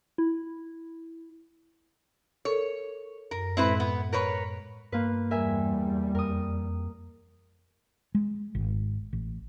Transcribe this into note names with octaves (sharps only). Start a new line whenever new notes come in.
E4
A4 A#4 C#5
F#2 A#4
A2 G#3 C4 E4 B4
B3
A#4 B4 C#5
G2 A#3 F4 B4
E2 G3 A#4 E5 G#5
F2 A#4 D#6
G#3
G#1
A1